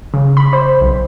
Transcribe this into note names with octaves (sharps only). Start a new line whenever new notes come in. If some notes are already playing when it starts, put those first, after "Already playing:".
C#3
B5
C5
B1